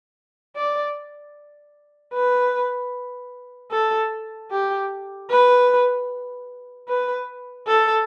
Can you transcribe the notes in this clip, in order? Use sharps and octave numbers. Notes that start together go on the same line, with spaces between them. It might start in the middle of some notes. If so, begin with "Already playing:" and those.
D5
B4
A4
G4
B4
B4
A4